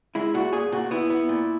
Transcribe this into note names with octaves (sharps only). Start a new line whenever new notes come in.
G#3 E4
A#2 F#4
A#2 G#4
A#2 F#4
B3 E4
B3
A#2